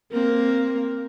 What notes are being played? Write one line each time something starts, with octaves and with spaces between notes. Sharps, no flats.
A#3 C4 A#4